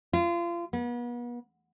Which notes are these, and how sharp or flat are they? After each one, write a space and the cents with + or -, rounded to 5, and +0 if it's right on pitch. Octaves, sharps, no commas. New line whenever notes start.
F4 -30
B3 -40